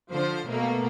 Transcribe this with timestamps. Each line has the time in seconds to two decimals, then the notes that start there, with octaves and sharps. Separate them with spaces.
0.11 D3 F3 C5
0.48 B2 A3 A#3